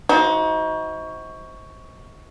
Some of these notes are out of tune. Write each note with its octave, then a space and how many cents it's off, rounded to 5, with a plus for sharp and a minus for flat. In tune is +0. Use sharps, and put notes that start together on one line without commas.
F3 +0 D#4 +35 F#4 +10